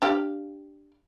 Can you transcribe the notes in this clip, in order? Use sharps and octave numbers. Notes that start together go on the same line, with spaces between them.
D4 G4 F5